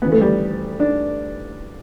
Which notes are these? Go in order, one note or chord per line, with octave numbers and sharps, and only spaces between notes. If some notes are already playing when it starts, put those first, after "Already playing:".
D2 C#3 E3 B3
A3
G3
D4